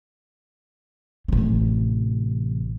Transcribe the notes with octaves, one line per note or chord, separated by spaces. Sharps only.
A1 C3